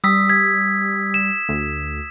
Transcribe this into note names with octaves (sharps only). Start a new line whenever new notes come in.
G3 D#6 E6 B6
G#6 B6
E7
D2